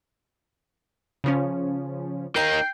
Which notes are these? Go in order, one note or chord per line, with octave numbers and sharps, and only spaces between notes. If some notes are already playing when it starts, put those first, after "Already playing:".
C#3 F3 C#4
A#3 D#4 G5 C7